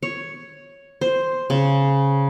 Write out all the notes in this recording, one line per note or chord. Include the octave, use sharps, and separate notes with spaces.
C#5
C5
C#3